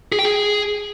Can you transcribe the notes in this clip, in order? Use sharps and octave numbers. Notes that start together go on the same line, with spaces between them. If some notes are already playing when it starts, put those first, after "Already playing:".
G#4
G5
G#4